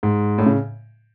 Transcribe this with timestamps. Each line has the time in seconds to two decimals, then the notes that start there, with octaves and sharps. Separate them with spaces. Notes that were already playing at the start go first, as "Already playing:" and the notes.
0.03 G#2
0.38 A2
0.46 C#3